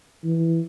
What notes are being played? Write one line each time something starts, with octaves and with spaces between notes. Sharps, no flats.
E3